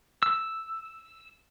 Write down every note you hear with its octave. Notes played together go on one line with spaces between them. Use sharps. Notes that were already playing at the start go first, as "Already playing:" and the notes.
E6